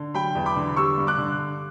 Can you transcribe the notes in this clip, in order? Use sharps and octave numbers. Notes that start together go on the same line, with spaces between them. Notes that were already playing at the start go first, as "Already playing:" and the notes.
Already playing: D3
F#3 G5 B5
E2
B5 D6
D3
G3 C#6 E6
G2
D6 F#6
D3